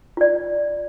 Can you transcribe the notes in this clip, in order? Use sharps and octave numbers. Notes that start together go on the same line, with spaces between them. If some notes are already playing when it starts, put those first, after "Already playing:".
F4 D5